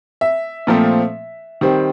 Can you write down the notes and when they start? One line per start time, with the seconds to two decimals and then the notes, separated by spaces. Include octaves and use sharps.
0.21 E5
0.67 A#2 F3 A3 C4
1.61 D#3 G3 C4